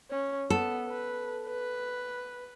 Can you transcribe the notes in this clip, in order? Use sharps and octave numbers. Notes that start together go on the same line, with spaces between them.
C#4
B3 A4
B4
B4